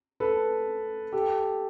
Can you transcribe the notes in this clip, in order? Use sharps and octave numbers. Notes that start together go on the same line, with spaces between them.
A4 B4
G4 A4